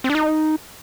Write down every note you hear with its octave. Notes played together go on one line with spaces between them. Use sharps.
C4
D4
D#4